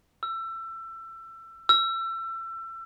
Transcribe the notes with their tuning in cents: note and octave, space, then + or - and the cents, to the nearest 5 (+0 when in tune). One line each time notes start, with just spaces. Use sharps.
E6 +25
E6 +30